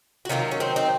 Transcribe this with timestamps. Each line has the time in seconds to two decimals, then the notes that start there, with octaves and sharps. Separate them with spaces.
0.25 F#4
0.29 C3 D#3 F#3 A#3 C#4 F4
0.51 C#4
0.60 C4 D#4
0.76 C4 D#4